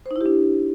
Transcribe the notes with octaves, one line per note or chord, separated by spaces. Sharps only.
C5
D#4
E4
G4
D4